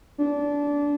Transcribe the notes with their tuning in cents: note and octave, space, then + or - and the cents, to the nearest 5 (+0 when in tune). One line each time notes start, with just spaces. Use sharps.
D4 -20